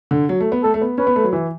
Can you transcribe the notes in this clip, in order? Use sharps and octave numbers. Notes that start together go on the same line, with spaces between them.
D3
F#3
A3
B3
A3 A4
A3
B3
C#4 B4
B3
A3
F#3
E3